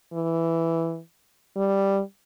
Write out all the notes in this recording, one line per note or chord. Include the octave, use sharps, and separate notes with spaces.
E3
G3